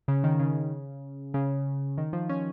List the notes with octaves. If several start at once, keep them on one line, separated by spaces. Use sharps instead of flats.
C#3
D#3
C#3
C#3
D#3
F3
C#4